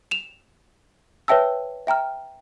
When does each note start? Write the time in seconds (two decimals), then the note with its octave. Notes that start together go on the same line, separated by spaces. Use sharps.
0.11 E7 F7
1.28 B4 C#5 E5 G5 A5 E6
1.87 E5 G5 A#5 F6